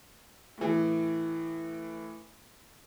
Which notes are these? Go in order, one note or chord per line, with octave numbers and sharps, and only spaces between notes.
A2 E3